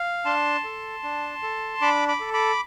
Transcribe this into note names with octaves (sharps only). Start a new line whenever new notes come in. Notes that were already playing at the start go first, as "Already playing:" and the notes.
Already playing: F5
D4 A5 C6
A4
D4
A4
D4 B5 D6
B5 D6
A4
B5 D6